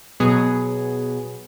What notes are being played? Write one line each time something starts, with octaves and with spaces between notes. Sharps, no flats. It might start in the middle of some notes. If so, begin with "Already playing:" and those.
B2 F#3 B3 G#4